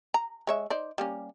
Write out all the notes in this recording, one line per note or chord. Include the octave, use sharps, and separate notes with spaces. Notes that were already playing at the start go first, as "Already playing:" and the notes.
A#5
G#3 C#5 E5
D#4 C5 D5
G3 A#3 C#4